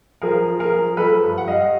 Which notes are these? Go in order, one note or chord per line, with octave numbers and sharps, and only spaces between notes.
F3 G#4 A#4
F3
G#4 A#4
F3
F3 A4 B4
G2
F#5
G2 D#5 F5